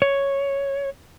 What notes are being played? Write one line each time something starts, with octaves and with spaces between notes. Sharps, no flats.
C#5